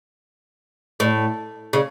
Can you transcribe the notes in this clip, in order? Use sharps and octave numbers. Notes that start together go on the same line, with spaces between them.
A2
C#3